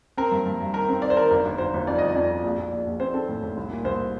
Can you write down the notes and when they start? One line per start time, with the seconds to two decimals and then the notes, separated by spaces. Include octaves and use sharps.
0.17 C4 A#4
0.31 G2
0.46 G2
0.61 G2
0.74 D#3 A#4
0.89 C4
1.02 D#3 D5
1.10 C5
1.16 D#3 A#4
1.30 G1 A#4
1.45 G1
1.58 G1 C5
1.74 G1
1.87 F2 D5
1.98 G1 D#5
2.09 D5
2.15 F2
2.30 F2
2.43 A#1
2.58 A#1
2.72 A#1
2.86 A#1
3.00 C4 C5
3.14 C4 A4
3.29 A2
3.43 A2
3.57 C2
3.70 A#2
3.85 C2 C5